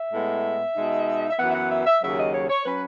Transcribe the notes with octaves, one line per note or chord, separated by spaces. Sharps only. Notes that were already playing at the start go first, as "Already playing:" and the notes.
Already playing: E5
A2 G#3 B3
B2 G#3 D#4
E5
F#2 E3 B3 F#5
E5
F#5
E5
E5
D#2 C#3 F#3 E5
D#5
C#5
C#5
F#3 C#4 B4